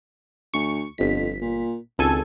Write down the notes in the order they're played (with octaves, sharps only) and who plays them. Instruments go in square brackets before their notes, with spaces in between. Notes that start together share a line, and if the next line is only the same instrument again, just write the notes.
[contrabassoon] D2 [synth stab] C#6
[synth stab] G1 B6 [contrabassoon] F2
[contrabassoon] A#2
[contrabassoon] G#1 [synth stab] C#2 A4 G#5